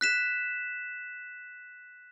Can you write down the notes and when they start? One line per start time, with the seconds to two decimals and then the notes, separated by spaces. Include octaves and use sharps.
0.01 F#6 B6 E7